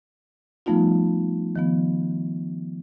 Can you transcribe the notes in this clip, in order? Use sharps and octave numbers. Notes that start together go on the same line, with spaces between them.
F3 G3 A3 B3 D#4 F4
D#3 F3 B3